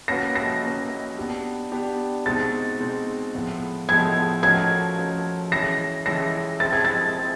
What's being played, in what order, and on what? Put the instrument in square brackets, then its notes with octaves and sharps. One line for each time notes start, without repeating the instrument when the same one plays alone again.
[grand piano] A#3 C#4 F#4 B4 [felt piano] A#6
[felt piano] A#6
[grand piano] A#3 C#4 F#4 B4
B3 D4 G4
B3 D4 G4
[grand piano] B2 G#3 C4 D#4 [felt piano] A6
[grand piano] B2 G#3 C4 D#4
A2 F3 G#3 B3
[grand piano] A2 F3 G#3 B3 [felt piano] G#6
[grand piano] F3 A3 C#4 F#4 A#4 [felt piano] G#6
[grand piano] F3 A3 C#4 F#4 A#4
[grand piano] E3 G#3 C#4 [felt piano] A#6
[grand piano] E3 G#3 C#4 [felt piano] A#6
[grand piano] G#3 C4 E4 [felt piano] A6
[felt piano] G#6
A6
[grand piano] G#3 C4 E4